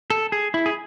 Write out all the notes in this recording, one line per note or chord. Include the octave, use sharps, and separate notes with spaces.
A4
G#4
E4
G#4